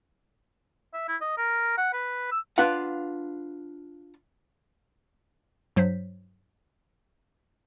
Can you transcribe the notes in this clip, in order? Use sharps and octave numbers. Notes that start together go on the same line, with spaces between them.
E5
E4
D#5
A#4
F#5
B4
E6
D4 F4 B4 F5 F#5
G2 F#3 C5 B6